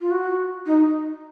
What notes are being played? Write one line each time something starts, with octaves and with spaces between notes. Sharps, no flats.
F4
F#4
D#4